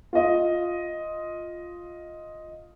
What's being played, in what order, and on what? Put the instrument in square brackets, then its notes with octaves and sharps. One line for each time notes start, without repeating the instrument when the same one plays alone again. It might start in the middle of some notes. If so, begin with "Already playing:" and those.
[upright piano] F4 D#5